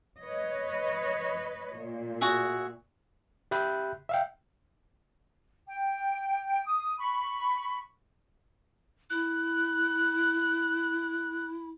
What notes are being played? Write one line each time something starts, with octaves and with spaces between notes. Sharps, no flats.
B4 C#5 D#5
A#2
F#4 G#4 E5
G4 E5 B5 F#6 G6
E5 F5 G5
G5
D#6
B5 C#6
E4 F#6